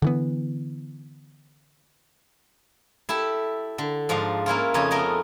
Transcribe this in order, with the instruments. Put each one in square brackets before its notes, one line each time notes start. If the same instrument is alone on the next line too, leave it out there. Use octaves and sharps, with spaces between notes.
[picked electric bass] D3 E3 B3
[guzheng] E4 G4 A4 A5
D3
G#2 F3 D4 F5
A#3 C#4 E4 F4
F2 C#3 D#4 B4 C#5
A3 B3 A#4 C#5 D#5 G#5